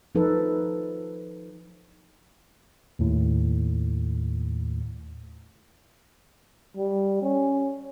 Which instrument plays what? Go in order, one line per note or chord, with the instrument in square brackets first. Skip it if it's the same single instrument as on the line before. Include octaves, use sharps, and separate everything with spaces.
[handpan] F3 D#4 A4 B4
[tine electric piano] D#2 A2
[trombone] G3
C#4